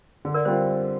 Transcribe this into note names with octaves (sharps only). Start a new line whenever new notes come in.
D3
A#4 D5
G3 C4 F4 C5